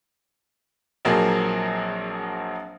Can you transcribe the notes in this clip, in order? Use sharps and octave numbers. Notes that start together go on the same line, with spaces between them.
A#1 F3 F#3 A#3 C4 G#4